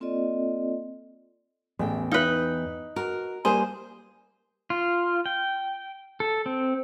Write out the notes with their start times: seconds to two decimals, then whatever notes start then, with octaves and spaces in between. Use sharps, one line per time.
0.01 A#3 C4 F4 A4 D5 D#5
1.79 A1 E2 G5
2.11 D#4 B4 E5 F5 F6
2.96 F#4 A#4
3.45 G3 A#3 G#4 C5 C6
4.70 F4
5.26 G5
6.20 A4
6.46 C4